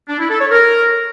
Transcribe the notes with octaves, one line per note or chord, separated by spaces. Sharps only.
D4
E4
A4
C#5
A#4